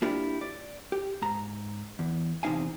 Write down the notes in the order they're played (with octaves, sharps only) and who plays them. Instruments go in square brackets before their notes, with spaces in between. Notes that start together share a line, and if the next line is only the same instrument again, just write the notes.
[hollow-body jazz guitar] A#3 D4 E4 F4 G4
D5
G4
G#2 A#5
E2
E2 C3 D#3 D#4 F5 G#5